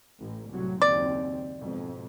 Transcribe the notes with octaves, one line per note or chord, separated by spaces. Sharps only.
A1
C2 A2 F#3
F#1 D#2 C4 D5
F2 G#2 B2